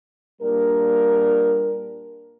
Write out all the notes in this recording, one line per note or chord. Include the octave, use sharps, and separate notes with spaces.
A#2 G3 A#3 D4 A#4